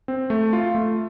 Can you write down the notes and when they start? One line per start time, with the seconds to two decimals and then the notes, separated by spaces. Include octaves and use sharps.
0.08 C4
0.30 A3
0.53 F4
0.75 A3